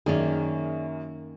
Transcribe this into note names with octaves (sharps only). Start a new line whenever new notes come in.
F#2 D#3 A#3 C#4 G#4 D5